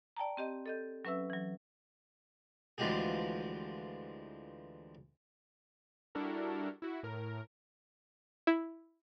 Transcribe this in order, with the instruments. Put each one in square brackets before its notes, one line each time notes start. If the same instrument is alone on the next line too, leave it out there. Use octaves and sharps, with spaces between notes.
[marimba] D5 G5 A5 A#5
C4 G4 D#5
A4 D#5 G6
F#3 C#4 B4 E5 E6
E3 F#3
[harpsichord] D2 E3 F3 G#3 G4 G#4
[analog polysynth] G3 D4 E4 F#4 A4 A#4
E4 F#4
A2 A#4
[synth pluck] E4